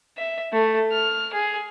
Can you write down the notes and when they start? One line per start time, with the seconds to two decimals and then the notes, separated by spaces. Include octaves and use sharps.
0.17 E5
0.52 A3
0.92 F6
1.34 G#4